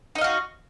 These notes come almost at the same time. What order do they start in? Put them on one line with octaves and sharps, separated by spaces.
D#4 D#5 F5 F#4